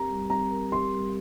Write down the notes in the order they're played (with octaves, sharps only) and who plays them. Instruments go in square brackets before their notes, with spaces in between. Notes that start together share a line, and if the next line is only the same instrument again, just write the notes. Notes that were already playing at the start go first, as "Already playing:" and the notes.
Already playing: [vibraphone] C4 G4 A#4 [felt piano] A#5
[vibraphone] G3
[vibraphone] C4 [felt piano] A#5
[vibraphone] A#4
[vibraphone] G4 [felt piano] C6
[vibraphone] G3